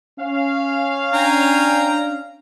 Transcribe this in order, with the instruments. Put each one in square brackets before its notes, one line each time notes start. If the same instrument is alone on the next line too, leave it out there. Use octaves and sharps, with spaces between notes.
[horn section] C#4 F5
[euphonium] D4 [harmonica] G5 G#5 A#5